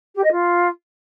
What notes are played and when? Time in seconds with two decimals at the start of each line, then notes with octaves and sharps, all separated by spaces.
0.15 G4
0.23 D#5
0.32 F4